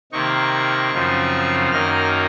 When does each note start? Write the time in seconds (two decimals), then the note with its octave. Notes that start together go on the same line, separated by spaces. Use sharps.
0.12 C3 D#3 A#3 D#4 C#6
0.92 F#2 C#3 F3 C4 D#4
1.71 F#2 D#3 A#3 D#4 F6